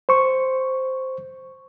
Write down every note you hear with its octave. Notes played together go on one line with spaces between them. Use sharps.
C5 C#6